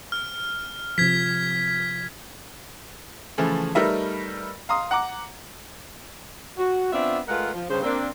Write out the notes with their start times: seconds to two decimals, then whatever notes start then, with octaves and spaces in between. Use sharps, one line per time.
0.12 F6
0.98 C3 F3 G#6 B6
3.38 C#3 E3 F3 A3
3.75 G3 A3 D#4 A#4 B4 E5
4.69 F5 A#5 C6 D#6
4.91 F#5 A#5 D6
6.57 F#4
6.92 B3 C4 D4 F4 E5
7.28 G#3 A3 F4 A#4 B4 F#5
7.53 F3
7.69 G2 C#3 C5
7.83 A#3 C4 D4